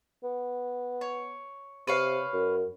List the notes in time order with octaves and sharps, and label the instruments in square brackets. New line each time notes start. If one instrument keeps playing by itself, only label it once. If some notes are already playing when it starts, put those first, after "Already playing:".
[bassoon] B3
[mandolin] C#5
[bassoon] C3 [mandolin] B4 C#5 F5
[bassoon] F#2